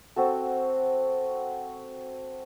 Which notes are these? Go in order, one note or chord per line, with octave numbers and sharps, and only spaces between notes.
C4 F#4 A4